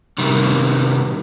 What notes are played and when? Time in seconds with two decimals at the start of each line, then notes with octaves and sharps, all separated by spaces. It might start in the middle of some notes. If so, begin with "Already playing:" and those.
0.18 C3 D#3 G3